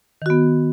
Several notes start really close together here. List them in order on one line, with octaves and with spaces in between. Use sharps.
D#3 F#4 B3